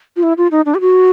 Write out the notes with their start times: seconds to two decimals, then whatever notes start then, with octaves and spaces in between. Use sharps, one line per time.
0.16 F4
0.23 E4
0.37 F4
0.51 D#4
0.66 D4
0.75 G4
0.81 F#4